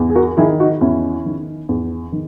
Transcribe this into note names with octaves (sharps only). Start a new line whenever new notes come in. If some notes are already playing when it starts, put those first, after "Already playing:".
Already playing: E2
G#4
F#4 A#4
D#3 E4 G#4
D#4 F#4
E2 C#4 E4
D#3
E2
D#3